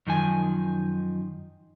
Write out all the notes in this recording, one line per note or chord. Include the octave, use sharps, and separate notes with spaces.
F#2 D#3 F3 G#5